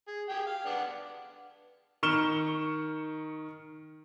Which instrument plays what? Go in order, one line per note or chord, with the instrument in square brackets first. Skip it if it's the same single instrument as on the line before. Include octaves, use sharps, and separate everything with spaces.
[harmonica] G#4
G4 G#4 G5
F5
B3 D4 F#5
[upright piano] D#3 C#6 F6 E7 G7